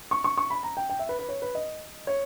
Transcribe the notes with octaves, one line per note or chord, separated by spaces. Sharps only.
C#6
C#6
C#6
B5
A#5
G5
G5
E5
B4
B4
C#5
B4
D#5
C#5